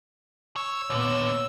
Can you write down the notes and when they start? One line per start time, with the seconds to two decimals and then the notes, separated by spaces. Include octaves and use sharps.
0.56 C#5 E6
0.90 D#2 A#2 D3 B3 C#5